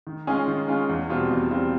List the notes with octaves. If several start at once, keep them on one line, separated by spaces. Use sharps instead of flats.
D#3
G#3 C#4 F4 G#4
D#3
G#3 C#4 F4 G#4
E2
B2 G3 C4 F4
E2
B2 G3 C4 F4